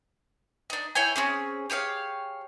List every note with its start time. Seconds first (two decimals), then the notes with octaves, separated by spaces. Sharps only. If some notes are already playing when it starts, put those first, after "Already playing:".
0.70 D4 D#4
0.95 E4 C#5 G5 G#5
1.16 C4 C#4 G#4
1.70 G4 G#4 C#5 F5